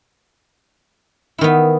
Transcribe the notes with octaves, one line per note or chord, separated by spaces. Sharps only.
D#3 B3 E4